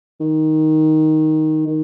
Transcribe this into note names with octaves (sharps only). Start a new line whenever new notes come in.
D#3
D#3